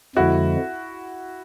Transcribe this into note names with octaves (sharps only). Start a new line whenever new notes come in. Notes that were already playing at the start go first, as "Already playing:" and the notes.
F2 D3 F3 G#3 E4 F#4